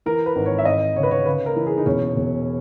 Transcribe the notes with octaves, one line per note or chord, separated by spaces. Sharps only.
E3 A#4
B4
G#1
C#5
E5
G#1 D#5
C#3 C#5
B4
C#5
C#3 B4
A#4
E3
G#4
D#4
E1 C#4
E1